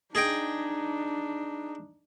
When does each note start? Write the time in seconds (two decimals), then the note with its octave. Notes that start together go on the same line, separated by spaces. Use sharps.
0.15 D4 D#4 G#4 D#5 G5